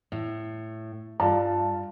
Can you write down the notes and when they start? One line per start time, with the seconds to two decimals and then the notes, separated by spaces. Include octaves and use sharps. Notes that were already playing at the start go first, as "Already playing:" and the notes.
0.12 A2
1.20 G2 F4 A5